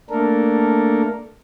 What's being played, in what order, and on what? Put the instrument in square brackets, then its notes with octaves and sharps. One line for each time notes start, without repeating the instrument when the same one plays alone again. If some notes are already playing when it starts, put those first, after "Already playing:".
[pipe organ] A3 A#3 D4 A4 A#4